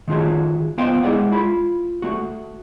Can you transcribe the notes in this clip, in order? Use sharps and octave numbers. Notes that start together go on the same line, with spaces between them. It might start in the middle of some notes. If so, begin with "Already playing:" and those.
D#3 A3 F4 F#4 G#4
B3 F4 C5 D#5 F5 G5
G#3 E4 G#4 D5 F#5
F4 B5
A3 F#4